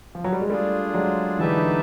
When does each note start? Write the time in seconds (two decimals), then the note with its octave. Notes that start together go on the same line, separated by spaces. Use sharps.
0.15 F3
0.24 F#3
0.33 G3
0.42 G#3
0.50 G3 A3 D4 F4 G#4
0.94 F#3 G#3
1.39 D3 E3 D#4 G4 B4 E5 A5